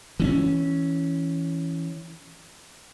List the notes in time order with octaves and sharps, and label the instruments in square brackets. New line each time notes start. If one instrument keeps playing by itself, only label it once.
[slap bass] E3 C4 C#4